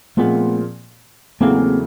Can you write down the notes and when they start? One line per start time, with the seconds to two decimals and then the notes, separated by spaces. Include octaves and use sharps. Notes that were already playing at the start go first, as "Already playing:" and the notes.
0.17 A#2 F3 G#3 A3 B3 C4 F4
1.40 E2 C#3 F#3 A3 A#3 C4